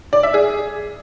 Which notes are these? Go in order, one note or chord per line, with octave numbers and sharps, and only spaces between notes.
D5
E5
G#4